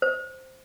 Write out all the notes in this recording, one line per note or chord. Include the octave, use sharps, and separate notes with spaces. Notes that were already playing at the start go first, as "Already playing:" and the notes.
C5